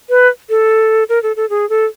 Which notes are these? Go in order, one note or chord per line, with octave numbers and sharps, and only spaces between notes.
B4
A4
A#4
A4
A4
G#4
A4